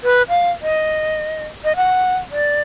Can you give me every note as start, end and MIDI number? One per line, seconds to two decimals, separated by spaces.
0.04 0.22 71
0.29 0.51 77
0.62 1.46 75
1.64 1.76 75
1.76 2.16 78
2.31 2.61 74